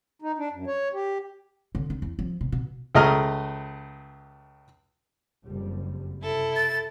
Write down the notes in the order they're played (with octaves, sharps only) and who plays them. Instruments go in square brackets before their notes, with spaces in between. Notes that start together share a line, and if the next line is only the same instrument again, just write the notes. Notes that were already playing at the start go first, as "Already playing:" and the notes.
[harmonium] D#4
D4
F#2
C#5
G4
[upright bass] D3
D4
E2
F3
B2
B2
[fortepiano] C#2 A3 G#4 D#5 A#5 F6
[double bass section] F#1 F2 G3
[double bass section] C3 [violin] E4 A4
[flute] A6